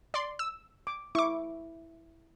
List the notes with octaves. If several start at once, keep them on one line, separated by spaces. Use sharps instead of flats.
D5 C6
E6
D6
E4 C#6 D6